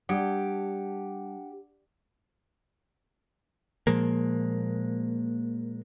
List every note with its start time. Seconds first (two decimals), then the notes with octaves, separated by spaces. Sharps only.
0.09 G3 D4 G4 F#5
3.87 A#2 F3 G#3 A#3